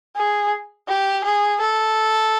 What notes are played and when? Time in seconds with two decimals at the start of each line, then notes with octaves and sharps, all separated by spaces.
0.16 G#4
0.88 G4
1.24 G#4
1.60 A4